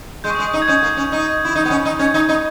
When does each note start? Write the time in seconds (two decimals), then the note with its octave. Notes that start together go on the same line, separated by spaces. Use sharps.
0.24 G#3 G6
0.30 C#6
0.35 G#3 D#6
0.53 D#4
0.57 D#6 G#6
0.68 C#4 G6
0.83 A#3
0.97 C#4
1.12 D#4
1.45 E4
1.55 D#4 G6
1.65 B3
1.70 C#4
1.85 D#4
1.99 C#4 G#6
2.14 D#4
2.29 D#4